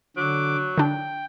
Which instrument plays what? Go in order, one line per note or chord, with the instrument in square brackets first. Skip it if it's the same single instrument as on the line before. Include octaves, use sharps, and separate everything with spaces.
[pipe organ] D3 D6 [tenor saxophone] F#3
[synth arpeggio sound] D3 D4 [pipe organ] G5